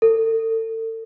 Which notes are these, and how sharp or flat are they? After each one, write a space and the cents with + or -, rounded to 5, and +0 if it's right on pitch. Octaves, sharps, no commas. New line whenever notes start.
A4 +35